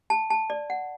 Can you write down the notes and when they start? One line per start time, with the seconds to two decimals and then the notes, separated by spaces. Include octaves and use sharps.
0.10 A5
0.30 A5
0.50 D5
0.70 F#5